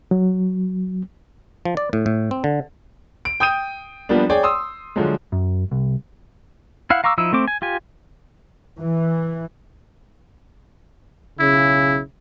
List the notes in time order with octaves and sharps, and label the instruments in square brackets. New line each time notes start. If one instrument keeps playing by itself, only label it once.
[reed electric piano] F#3
[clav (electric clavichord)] F3
D5
A2
A2
C4
D3
[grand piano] D7
G5 D#6 G6 D#7
F3 G3 A#3 B3 D4
G#4 C#5 D5 G5
C6 D#6 E6
D3 F3 F#3 G#3
[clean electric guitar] F#2
C2
[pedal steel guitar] E4 F5 F#5
F5 A#5 C#6 D6 E6
F3 D#4 E4 E6
A3 C4 C5 D6
G#5
F4 G4 G#5
[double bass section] E3
[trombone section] B1 C#3 [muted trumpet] E4